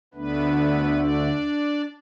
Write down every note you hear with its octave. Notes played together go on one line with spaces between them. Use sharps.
D2 D3 A3 B3 D4 B4
D4 D5